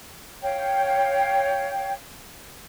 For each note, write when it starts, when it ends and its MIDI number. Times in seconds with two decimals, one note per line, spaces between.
0.42 1.93 73
0.42 1.93 77
0.42 1.93 79